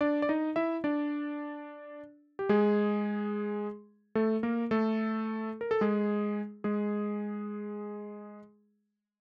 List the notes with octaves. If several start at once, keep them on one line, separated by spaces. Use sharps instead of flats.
D4 D5
D5
D#4 D#5
E4 E5
D4 D5
G4
G#3 G#4
A3 A4
A#3 A#4
A3 A4
A#4
A4
G#3 G#4
G#3 G#4